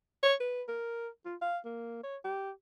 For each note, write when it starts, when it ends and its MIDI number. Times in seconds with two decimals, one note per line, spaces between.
0.23 0.34 73
0.40 0.63 71
0.68 1.08 70
1.25 1.36 65
1.42 1.58 77
1.65 2.02 58
2.03 2.16 73
2.24 2.51 67